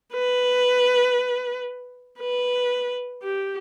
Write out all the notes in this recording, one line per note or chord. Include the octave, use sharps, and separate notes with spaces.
B4
B4
G4